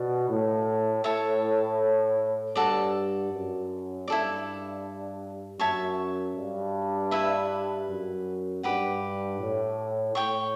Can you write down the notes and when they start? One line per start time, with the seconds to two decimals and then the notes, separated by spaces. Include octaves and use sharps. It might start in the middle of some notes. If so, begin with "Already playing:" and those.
Already playing: B2 D5
0.29 A2
1.04 A2 C#5 E5 A5
2.55 G2 F#4 A4 D5
3.32 F#2
4.08 G2 E4 A4 D5
5.60 F#2 C#5 E5 A5 C#6
6.35 G2
7.11 E4 B4 E5
7.88 F#2
8.63 G2 G4 B4 F#5
9.39 A2
10.15 A2 C#5 G5 C#6